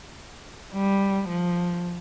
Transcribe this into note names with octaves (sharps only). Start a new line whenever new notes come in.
G3
F3